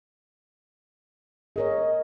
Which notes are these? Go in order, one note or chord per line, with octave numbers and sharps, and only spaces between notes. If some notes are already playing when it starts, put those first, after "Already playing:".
G#4 A#4 C#5 D#5